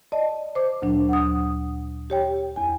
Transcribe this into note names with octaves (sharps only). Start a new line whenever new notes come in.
D5 D#5 A5
C5 D6
D2 A#2 F#3 D4
F#5 D#6
G4 C#5 G5
E2 G#5